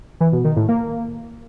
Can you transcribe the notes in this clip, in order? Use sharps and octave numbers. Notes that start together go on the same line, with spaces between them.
E3
B2
D#3
A2
A#3